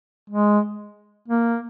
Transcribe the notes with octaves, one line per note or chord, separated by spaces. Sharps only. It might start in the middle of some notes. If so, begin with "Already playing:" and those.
G#3
A#3